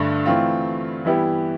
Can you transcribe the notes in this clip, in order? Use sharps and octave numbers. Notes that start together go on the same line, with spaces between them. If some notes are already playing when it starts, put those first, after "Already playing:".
Already playing: G2 D3 A3 D4
E3 A3 C4 F4
E3 G3 B3 E4 G4